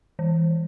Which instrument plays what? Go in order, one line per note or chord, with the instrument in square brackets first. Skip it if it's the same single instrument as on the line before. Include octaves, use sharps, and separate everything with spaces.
[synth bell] E3